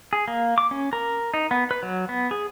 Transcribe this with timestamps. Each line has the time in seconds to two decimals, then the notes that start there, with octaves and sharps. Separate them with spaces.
0.13 G#4
0.28 A#3
0.58 D6
0.71 C#4
0.93 A#4
1.34 D#4
1.51 B3
1.71 B4
1.83 F#3
2.09 B3
2.31 G#4